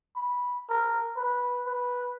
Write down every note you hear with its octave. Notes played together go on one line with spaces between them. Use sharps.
B5
A#4
B4
B4